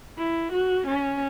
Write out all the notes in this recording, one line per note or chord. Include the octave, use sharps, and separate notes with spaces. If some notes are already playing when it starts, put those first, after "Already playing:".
E4
F#4
C#4